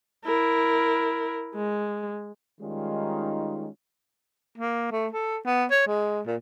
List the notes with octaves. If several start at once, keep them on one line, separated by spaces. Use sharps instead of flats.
E4 A#4
G#3
D#3 G3 G#3 C#4 D#4 F4
A#3
A3
A4
B3
C#5
G#3
A#2